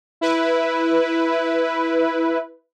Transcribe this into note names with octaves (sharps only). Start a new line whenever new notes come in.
E4 B4